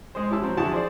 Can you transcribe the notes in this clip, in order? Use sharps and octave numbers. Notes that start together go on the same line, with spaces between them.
G#3 G#4 C5
C#4 E4 G4 A5 E6
F#3 C4
F2 D3 E4 F#4 G#4 A5
G#4 C5 D5